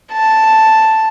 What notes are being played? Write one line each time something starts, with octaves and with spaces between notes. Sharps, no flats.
A5